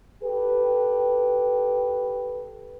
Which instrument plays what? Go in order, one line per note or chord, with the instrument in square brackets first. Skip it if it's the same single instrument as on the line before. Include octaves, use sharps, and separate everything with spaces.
[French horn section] G4 A4 B4